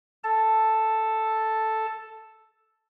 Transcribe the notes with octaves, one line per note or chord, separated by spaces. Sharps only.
A4 A5